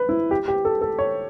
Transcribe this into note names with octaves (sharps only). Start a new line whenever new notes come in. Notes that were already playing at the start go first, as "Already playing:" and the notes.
Already playing: B4
E4
G4
G4
A4
A4
C#5